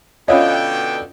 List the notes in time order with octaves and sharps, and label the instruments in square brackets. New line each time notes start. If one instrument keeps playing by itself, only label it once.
[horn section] B2 D3 G5 [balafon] C#4 F4 C#5 [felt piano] D#5 F5